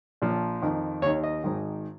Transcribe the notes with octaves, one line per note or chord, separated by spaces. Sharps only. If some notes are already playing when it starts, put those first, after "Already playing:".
A#1 A#2 F3
F2 D#3
D#2 D#3 C#5
D#5
G#1 G#2 D#3